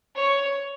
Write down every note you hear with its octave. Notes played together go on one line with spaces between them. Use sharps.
C#5